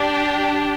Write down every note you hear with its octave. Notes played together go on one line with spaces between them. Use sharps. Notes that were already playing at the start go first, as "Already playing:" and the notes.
Already playing: D4 G4